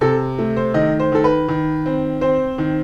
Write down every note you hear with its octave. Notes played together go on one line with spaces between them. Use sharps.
C3 A4
A3
C5
D#3 D#5
C5
D#3 A4
B4
D#3
C4
C4 C5
D#3